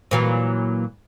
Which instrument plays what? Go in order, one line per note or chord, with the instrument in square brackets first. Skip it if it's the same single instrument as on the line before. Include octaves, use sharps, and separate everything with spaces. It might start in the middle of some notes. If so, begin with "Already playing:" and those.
[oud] A#2 E3 F#3